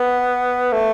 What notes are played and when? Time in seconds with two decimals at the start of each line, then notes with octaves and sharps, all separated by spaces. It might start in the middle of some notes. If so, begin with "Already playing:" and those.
Already playing: B3
0.73 A3